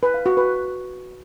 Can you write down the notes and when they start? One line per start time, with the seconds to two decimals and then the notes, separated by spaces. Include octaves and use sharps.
0.03 B4
0.14 F5
0.26 F#4
0.37 B4